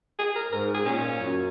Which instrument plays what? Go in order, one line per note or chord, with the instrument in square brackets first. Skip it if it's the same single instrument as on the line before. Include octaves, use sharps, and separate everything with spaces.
[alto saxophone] G#4
A#4
[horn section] G#2 [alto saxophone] A#4
[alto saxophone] G#4
[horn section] A#2 [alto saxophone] C#4
[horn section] F#2